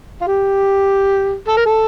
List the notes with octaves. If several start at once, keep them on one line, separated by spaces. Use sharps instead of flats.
F4
G4
A4
A#4
A4